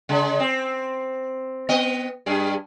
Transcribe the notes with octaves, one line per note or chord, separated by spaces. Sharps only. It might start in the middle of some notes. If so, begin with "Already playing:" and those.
C#3 G#3
C4
B3 D#5
G2 G3 G#4